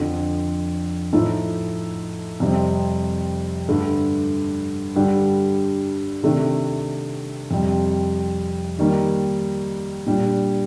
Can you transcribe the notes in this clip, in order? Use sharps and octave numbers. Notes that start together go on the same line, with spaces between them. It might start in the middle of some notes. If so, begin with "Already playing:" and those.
Already playing: F2 D3 F3
A2 F3 A3 D#4 A4
F2 C3 G3 C4
G2 D3 A3
G2 D3 G3 D4 G4
C3 D#3 A3 D4
F2 C3 G3
D#3 G3 A#3 D#4
A#2 G3 D4